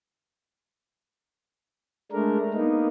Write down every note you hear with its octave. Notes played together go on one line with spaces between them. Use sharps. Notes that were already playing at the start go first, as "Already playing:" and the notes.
G#3 A3 D4 A#4
A#3 B3 D#4